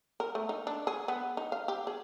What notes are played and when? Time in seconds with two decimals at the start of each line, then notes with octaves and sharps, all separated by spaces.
0.20 A#4
0.35 A3
0.49 D#4
0.67 D4
0.87 G#4
1.08 B3
1.37 D#4
1.52 F5
1.68 G4
1.87 G#4